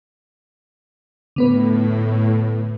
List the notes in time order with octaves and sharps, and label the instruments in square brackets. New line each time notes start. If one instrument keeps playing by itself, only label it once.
[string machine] A2 [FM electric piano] D3 B3 B4